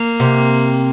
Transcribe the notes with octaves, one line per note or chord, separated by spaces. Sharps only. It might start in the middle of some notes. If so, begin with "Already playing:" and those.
Already playing: A#3
C3